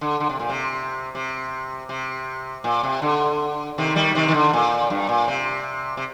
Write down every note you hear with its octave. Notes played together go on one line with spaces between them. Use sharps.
D3
D3
C3
A#2
C3
C3
C3
A#2
C3
D3
C3 D#3
D#3 G3
C3 D#3
D#3
D3
A#2
G2
A#2
C3
C3